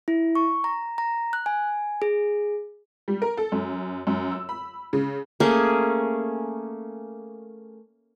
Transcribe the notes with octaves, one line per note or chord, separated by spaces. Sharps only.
E4
C#6
A#5
A#5
F#6
G#5
G#4
G3
A#4
A4
F#2
F#2
E6
B5
C#3
A3 A#3 C#4 G#4